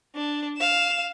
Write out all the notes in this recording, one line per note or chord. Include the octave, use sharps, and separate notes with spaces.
D4
F5 E7